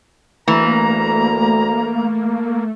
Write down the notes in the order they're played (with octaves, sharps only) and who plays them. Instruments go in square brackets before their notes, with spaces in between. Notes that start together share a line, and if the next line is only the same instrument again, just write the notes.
[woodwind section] D2 A#5 [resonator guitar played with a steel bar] E3 [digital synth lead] A3 [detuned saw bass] A#3